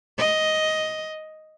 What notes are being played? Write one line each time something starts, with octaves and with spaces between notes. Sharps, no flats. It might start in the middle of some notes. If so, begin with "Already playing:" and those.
D#5